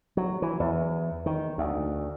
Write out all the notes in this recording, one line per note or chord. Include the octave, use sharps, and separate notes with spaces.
F#3
E3
E2
D#3
D2